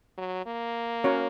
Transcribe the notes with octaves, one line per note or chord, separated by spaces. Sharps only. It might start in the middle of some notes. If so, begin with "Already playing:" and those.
F#3
A#3
C#4 F#4 A#4 C#5